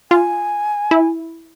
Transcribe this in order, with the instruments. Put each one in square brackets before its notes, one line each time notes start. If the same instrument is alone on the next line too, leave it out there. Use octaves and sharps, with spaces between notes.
[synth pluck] F4 [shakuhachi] G#5
[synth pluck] E4